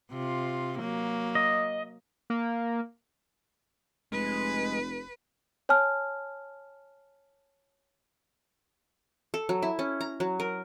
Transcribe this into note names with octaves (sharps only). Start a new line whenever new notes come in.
C3 F4
F#3 A#3
D#5
A#3
F1 G#3 B4
C#5 G#5 A5 F6
A4
F#3
E4
C#4
A#5
F#3
A#4